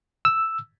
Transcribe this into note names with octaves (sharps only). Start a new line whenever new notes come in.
E6